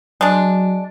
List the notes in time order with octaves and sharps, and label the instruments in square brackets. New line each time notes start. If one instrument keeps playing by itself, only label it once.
[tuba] F#3 [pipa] G#3 D4